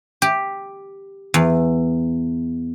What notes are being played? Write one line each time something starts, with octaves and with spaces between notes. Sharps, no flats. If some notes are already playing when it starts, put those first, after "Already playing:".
G4
E2